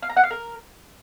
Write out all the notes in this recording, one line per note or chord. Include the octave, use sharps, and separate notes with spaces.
F5
A#5
F#5
F5
A#4